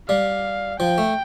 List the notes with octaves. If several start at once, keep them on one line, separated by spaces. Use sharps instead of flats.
G3 F5
F3 G5
A3